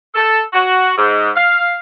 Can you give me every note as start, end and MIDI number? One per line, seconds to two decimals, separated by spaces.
0.15 0.41 69
0.53 0.91 66
0.97 1.30 44
1.36 1.77 77